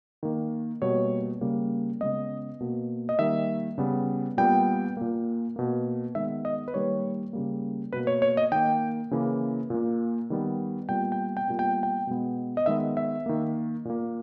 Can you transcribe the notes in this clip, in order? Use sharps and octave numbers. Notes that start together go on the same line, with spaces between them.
D#3 A#3
B2 G3 A#3 C#5
C#3 G3 A#3
C#3 G#3 B3 D#5
B2 A#3
D#5
D#3 G3 A#3 E5
C#3 G3 B3
A#2 G3 B3 G5
A#2 A#3
B2 A#3
D#3 G#3 B3 E5
D#5
B4
D#3 G3 A#3 C#5
C#3 G3 A#3
B2 A#3 B4
C#5
C#5
D#5
D#3 A#3 G5
C#3 E3 A#3
A#2 A#3
D#3 G3 B3
A#2 G3 B3 G5
G5
G5
A#2 G3 B3
G5
G5
B2 G#3 B3
D#5
D#3 G#3 B3 E5
E5
D#3 A#3
A#2 A#3